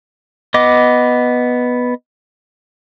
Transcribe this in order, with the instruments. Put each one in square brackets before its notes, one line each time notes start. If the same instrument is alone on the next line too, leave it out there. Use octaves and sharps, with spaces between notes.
[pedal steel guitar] B3 D#5 D6